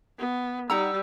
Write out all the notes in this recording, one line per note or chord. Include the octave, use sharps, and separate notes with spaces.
B3
G3 D#4 F#5 A#5 E6